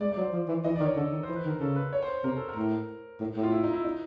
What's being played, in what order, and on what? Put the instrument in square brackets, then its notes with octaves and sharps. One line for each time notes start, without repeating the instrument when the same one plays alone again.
[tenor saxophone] G#3 [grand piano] D5
[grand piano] D5
[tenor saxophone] F#3
[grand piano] C5
[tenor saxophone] F3
E3
[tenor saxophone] E3 [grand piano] D#5
[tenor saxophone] D#3 [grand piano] D5
[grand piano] C#5
[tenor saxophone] D3 [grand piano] A4
[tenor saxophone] D#3
[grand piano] C5
[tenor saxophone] E3
[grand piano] B4
[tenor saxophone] D#3
[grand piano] A#4
[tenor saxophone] C#3 [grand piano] A4
[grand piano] B4
C#5
C5
[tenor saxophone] C3 [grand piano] A#4
[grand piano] A4
A#4
[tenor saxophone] A2
A2
A2
[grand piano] F4
E4
D#4
E4
D#4